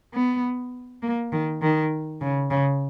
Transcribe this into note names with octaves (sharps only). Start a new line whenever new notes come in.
B3
A#3
D#3
D#3
C#3
C#3